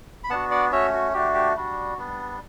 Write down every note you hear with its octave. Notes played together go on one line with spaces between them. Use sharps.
B5
B3 D4 F#4 F#5 A5
D5 F#5
A3 C#4 F#4 C#5 E5
F#4
A3 D4 F#4 G4
G4
G3 D4 F#4
G3 B3 D4